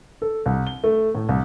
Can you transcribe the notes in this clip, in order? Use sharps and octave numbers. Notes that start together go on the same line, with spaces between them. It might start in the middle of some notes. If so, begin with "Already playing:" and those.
A4
C2
G7
A3
A2
C2